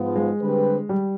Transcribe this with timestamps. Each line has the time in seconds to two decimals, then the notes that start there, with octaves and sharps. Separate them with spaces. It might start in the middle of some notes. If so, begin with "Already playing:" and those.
Already playing: G#2 F3 B3 F4
0.16 G#3
0.40 D3 G3 C4 G4 B4
0.89 G3